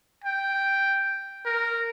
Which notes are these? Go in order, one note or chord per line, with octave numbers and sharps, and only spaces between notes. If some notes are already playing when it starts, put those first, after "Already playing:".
G5
A#4